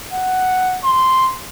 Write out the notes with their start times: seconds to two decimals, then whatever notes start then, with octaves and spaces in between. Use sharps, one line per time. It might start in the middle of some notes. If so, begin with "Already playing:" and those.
0.13 F#5
0.84 C6